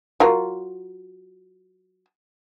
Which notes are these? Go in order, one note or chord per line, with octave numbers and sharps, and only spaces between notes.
F#3 F4 A#4